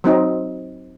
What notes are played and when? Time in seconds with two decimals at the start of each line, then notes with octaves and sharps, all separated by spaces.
0.04 F#3 C4 D#4